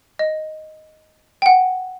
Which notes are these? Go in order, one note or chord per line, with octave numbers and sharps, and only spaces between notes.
D#5
G5
F#5